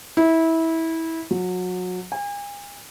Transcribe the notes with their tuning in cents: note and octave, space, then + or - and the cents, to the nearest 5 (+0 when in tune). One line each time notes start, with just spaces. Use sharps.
E4 -20
F#3 -25
G#5 -40